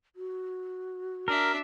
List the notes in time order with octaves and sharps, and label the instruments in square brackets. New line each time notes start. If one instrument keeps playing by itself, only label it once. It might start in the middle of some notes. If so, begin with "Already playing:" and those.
[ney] F#4
[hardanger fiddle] D4 E5 [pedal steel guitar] A#4